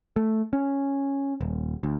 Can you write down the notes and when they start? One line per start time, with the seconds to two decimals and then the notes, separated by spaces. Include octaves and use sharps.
0.16 A3
0.53 C#4
1.41 D#1
1.83 D2